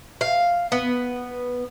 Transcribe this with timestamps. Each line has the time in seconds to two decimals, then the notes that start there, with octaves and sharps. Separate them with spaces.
0.21 F5
0.72 B3